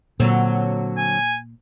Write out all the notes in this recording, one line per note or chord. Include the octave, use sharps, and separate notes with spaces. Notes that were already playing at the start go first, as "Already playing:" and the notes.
A#2 D3 F#3 C4
G#5